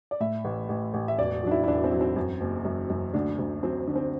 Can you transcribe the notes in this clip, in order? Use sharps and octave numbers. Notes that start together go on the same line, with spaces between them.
D5
A2 E5
A1
A1
A1
E5
E1 D5
F#3 D4
E4
E4
E1 D4
C4
F#3
C4
F#2
F#1
F#2
F#2
D2 D4
D2
F#3 C4
D3
C4